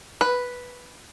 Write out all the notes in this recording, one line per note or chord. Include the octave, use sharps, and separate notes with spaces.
B4